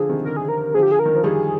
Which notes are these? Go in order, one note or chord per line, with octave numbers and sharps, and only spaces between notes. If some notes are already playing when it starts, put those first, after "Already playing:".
Already playing: D3 F3 G#4
C3 D#3
D3 A#4
G#4
A#4
D3 F3 G#4
G4
G#4
A#4
D#3
F3
D#3 G3 G#4